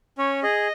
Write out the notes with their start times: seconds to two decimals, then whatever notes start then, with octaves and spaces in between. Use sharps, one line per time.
0.18 C#4 C#5
0.43 G#4 D#5